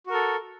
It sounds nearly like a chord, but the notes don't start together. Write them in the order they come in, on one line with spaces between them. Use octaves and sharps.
F#4 A#4 A4